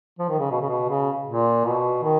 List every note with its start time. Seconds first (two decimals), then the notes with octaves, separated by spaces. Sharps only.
0.19 F3
0.29 D#3
0.39 C#3
0.51 B2
0.61 C#3
0.69 B2
0.89 C#3
1.27 A#2
1.65 B2
2.03 D#3